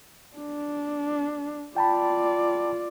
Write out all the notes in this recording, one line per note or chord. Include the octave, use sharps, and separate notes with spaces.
D4
F4 D5 G5 A5 B5